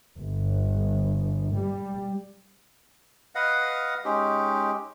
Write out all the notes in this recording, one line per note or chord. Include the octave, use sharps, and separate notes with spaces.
G1
G3
B4 D#5 F5 F#5
G#3 C#4 D#4 G4